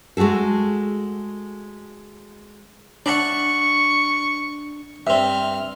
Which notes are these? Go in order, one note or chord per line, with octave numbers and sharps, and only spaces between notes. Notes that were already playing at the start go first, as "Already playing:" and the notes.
G#3 A3 F#4 G#4 A4
D4 D5 E5 F#5 C#6
G2 C4 E5 F6